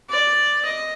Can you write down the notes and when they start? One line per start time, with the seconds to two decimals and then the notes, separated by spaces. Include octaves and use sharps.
0.09 D5
0.65 D#5